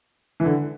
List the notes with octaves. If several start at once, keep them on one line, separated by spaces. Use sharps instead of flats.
E3
D3